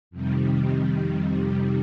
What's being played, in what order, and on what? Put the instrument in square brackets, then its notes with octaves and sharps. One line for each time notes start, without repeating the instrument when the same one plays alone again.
[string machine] F2 C3 D#3 G3